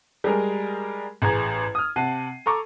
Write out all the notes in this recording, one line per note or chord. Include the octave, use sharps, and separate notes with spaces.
G3 G#3 G#4 A#4
A1 G#4 A#5 G#6
D#6 F6
C3 F#5 A5 C7 D#7
A4 A#5 C#6 D6